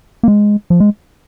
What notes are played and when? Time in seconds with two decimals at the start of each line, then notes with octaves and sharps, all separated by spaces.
0.23 A#3
0.28 G#3
0.70 F3
0.80 G#3